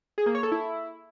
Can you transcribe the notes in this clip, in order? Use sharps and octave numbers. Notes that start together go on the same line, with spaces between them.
G#4
A#3
C#5
A4
E4